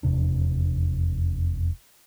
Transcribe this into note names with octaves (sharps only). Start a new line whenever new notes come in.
F1 E2 C3 D4